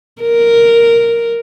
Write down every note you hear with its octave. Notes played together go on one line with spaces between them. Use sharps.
A#4